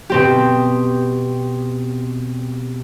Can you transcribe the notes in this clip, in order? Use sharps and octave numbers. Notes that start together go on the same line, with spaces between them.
B2 C4 G4